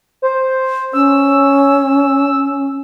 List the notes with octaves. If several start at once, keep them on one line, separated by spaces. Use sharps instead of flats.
C5
C#4 E6